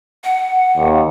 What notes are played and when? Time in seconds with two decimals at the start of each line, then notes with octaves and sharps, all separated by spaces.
0.24 F#5
0.77 D#2